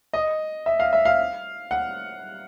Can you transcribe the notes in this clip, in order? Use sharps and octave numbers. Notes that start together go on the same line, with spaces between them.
D#5
E5
F5
E5
F5
F#5